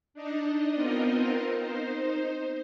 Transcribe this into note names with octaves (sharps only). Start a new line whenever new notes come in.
D4 D#4 D#5
B3 C4 D#4 F4 A#4 D#5
D#4 C5